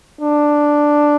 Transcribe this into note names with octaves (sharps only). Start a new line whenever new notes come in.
D4